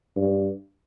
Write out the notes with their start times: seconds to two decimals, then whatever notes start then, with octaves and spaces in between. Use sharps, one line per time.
0.16 G2